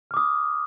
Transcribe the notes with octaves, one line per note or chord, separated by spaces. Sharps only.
D6 D#6 F6